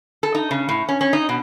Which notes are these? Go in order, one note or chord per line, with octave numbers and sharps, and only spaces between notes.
A4
D#4
C#3
A2
C#4
C#4
D#4
B2